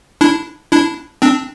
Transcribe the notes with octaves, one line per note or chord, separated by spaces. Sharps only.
D4 E4
D4 E4
C4 D4